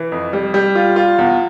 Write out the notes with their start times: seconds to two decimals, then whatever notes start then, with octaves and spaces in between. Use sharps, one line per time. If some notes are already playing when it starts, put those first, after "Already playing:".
Already playing: E3
0.12 F2
0.33 G3
0.54 G3
0.75 F4
0.96 F4
1.18 E2